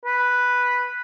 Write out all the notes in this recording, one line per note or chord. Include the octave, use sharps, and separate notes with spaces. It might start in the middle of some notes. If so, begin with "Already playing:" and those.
B4